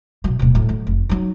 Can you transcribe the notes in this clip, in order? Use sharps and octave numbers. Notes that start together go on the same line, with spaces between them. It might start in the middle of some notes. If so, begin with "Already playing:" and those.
B2 F#3
D1 B2
A2 F#3
F#3 A3
F1
F#3 D#4